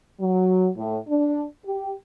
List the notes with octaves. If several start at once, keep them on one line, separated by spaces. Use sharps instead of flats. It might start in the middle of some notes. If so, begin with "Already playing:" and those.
F#3
A2
D4
G4